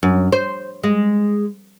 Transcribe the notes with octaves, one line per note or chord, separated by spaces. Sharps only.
F#2
C5
G#3